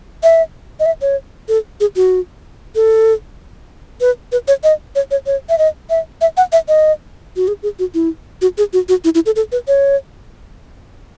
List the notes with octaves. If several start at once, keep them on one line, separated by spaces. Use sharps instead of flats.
E5
D#5
E5
C#5
A4
G#4
F#4
A4
B4
B4
C#5
D#5
C#5
C#5
C#5
E5
D#5
E5
E5
F#5
E5
D#5
F#4
G#4
G#4
F#4
E4
F#4
G#4
F#4
F#4
E4
E4
A4
A4
B4
C#5